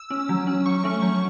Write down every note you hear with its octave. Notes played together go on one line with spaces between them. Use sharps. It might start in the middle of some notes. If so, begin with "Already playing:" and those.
Already playing: E6
C#4
F#3
C#4
F#3 C#6
A3 C#4
F#3